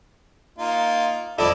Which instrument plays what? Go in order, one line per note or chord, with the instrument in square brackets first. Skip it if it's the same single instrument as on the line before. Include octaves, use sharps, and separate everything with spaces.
[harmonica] A#3 D#4 F4
[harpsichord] F2 D4 D#5 [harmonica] E4 A4 D5